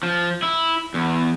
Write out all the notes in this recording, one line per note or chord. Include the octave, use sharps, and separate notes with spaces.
F3
E4
E2